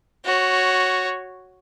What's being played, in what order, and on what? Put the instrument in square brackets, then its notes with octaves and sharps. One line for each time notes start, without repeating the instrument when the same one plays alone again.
[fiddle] F#4 C#5